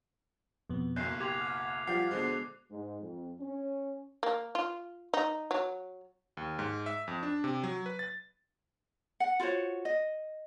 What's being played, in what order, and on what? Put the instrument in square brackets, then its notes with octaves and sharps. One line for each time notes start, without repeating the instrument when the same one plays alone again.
[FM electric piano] F2 B2 B3
[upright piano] F#1 B1 F#2 [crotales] F#6 C7 [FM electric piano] G6
[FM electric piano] G4 C6 F#6 [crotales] D6 G#6 F7
[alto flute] F#5 [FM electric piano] F6
[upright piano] F3 G3 [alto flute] F4 [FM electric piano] F#5 G6 [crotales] C7
[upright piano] B2 D3 G#3 [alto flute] C5
[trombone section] G#2
F2
C#4
[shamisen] A#3
F4
D#4
F#3
[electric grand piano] D#2
G#2
E5
F2
D4
C3
F#3
B4
A6
[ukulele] F#5
F4 F#4 C5 C#5
D#5